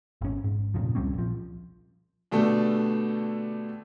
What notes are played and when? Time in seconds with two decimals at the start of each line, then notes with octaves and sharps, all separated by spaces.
0.21 G#1 E2 C#4
0.44 G#2
0.74 F2 A#2 C#3 F3
0.95 C#2 G3 C4 C#4
1.14 A#1 F3
2.32 B2 D3 A3 G4 A4